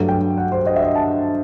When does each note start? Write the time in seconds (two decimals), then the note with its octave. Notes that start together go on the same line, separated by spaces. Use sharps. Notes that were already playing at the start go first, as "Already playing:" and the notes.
Already playing: G2 F#3 A3
0.09 G5
0.38 F#5
0.52 C5
0.66 D#5
0.76 E5
0.81 D#5
0.95 A5